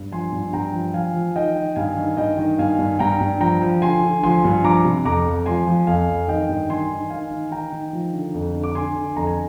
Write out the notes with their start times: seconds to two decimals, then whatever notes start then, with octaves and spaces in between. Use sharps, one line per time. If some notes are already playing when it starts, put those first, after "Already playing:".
Already playing: G2
0.11 F3 G#5 C6
0.32 G2
0.53 G2 G5 A#5
0.73 F3
0.94 F3 F5 G#5
1.14 F3
1.36 D#3 D#5 G5
1.56 D#3
1.76 G2 F5 G#5
1.97 D#3
2.17 G2 D#5 G5
2.38 D#3
2.58 G2 F5 G#5
2.79 G2
2.99 G2 G5 A#5
3.20 G2
3.40 F3 G5 A#5
3.62 F3
3.82 D3 G#5 C6
4.03 D3
4.23 F3 G#5 C6
4.44 G2
4.64 F3 A#5 D6
4.84 C3
5.05 F2 A#5 D6
5.26 F2
5.46 F3 G#5 C6
5.67 F3
5.87 F2 F5 G#5
6.08 F2
6.28 D#3 D#5 G5
6.49 G2
6.70 D#3 G#5 C6
6.91 D#3
7.10 D#3 F5 G#5
7.31 D#3
7.51 D#3 G5 A#5
7.73 D#3
7.93 F3
8.13 D3
8.34 F2
8.55 D3
8.63 D6
8.75 D3 G#5 C6
8.96 D3
9.16 F2 A#5
9.27 G#5